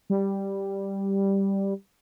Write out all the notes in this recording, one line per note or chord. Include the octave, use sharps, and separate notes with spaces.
G3